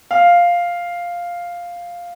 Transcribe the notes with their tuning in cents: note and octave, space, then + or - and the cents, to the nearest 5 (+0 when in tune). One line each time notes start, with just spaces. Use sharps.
F5 +0